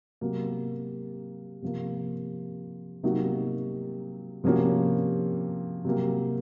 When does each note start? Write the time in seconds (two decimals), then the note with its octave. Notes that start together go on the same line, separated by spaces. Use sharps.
0.21 C3 F#3 A#3
1.62 C3 F3 A#3
3.03 C3 F#3 A#3 D#4 F#4
4.44 C3 F3 A#3 C#4 F#4
5.85 C3 F#3 A#3